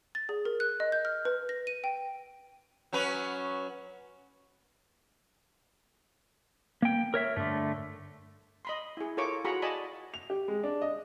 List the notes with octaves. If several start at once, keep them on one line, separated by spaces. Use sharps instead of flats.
A6
G#4
A#4
F#6
D#5
G6
F6
B4
A#6
D#7
G5
F#3 C#4 B4
A#3 G5
A#4 C#5 E5
G2 D3 A3
D#5 B5 C6
E4 G#4
F4 A4 A#4 C#5 C#6 D6
F4 F#4 G#4 A#5 B5 C#6
D5 D#5 G#5 A5 B5
F7
G4
G#3
D4
D#5